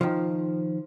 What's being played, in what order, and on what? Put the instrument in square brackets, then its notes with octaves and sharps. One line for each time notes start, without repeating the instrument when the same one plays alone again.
[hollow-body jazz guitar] D#3 F3